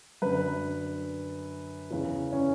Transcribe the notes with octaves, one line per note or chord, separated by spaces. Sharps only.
F#2 D3 B4
E2 C#3 E3
C#4